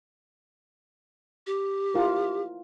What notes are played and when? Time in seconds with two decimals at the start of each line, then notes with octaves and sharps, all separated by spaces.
1.47 G4
1.94 E4 F4 A#4